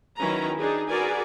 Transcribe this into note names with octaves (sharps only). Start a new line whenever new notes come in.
D#3 F#3 C#4 E4 B4 A#5
D4 D#4 G#4
F#4 G#4 A#4 B4 D5 G#5